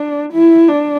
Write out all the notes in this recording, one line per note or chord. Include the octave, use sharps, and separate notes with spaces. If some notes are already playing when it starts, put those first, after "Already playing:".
Already playing: D4
E4
D4